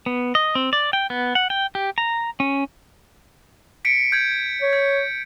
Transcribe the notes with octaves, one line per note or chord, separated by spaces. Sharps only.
B3
D#5
C4
D5
G5
B3
F#5
G5
G4
A#5
C#4
B6 C#7 D7
G6 G#6
C#5
G#6